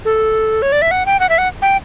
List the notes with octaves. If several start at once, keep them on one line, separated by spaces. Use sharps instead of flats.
A4
C#5
D5
E5
F#5
G5
F#5
E5
F#5
G5